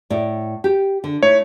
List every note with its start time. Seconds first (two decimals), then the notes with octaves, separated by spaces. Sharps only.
0.10 A2 D5
0.64 G4
1.04 D3
1.23 A3 D#4 E4 C#5